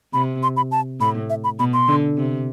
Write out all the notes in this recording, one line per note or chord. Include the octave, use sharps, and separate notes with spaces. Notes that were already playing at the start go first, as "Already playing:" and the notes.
C3 B5
C6
B5
A5
A2 B5
E5
B5
B2 B5
C6
D3
C3